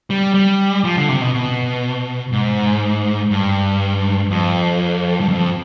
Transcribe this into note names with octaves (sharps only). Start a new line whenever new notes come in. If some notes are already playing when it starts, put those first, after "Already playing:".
G3
G3
F3
D3
C3
B2
B2
G#2
G2
F2
G2
F2